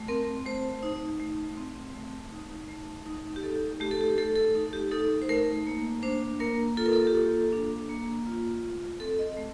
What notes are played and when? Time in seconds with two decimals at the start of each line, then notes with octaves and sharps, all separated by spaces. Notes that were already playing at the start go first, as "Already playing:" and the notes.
Already playing: A3
0.08 C4 A#4
0.46 A3 C5
0.83 D#4
1.20 A3
1.57 C4
1.94 A3
2.32 D#4
2.68 A3
3.06 D#4
3.36 G4
3.43 D#4 A4
3.80 A3 G4
3.91 A4
4.01 G4
4.18 A3 A4
4.36 A4
4.55 D#4
4.73 G4
4.91 D#4 A4
5.22 C5
5.29 A3 A#4
5.67 A#3
6.03 D4 C5
6.40 A#3 A#4
6.77 F4 A4
6.86 A#4
6.93 A4
7.07 G4
7.15 A#3 A4
7.52 D4
7.89 A#3
8.27 F4
8.64 A3
9.00 C4 A4
9.19 D#5
9.37 A3